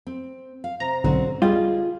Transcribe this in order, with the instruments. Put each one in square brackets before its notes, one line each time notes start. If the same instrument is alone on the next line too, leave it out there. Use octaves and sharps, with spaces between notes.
[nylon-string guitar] C4
F5
[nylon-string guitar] C3 [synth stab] A#5
[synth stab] B1 G#2 D3 [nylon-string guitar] F#3 C4 C#4
[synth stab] G3 [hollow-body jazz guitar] F4 [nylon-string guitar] G#4 D#5